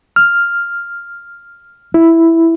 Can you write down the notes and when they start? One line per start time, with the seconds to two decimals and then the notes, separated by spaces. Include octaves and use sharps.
0.16 F6
1.94 E4